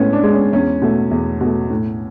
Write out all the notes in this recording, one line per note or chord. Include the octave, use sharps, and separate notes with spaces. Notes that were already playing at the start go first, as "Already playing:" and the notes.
Already playing: A2 G#3 B3 C#4
D4
G#3
C#4
E2 C#4
B2 A3
E2
B2 A3
A2